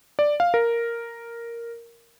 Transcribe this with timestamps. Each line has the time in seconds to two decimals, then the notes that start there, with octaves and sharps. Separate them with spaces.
0.19 D5
0.40 F5
0.54 A#4